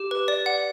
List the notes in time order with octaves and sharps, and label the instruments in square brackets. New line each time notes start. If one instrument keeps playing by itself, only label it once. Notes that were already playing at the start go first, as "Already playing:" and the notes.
Already playing: [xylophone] G4 D6
B4
D5
F#5